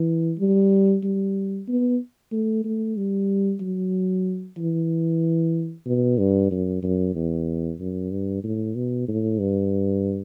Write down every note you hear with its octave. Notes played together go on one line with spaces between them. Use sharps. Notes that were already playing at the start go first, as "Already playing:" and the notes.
Already playing: E3
G3
G3
B3
A3
A3
G3
F#3
E3
B2
G2
F#2
F#2
E2
F#2
G2
A2
B2
A2
G2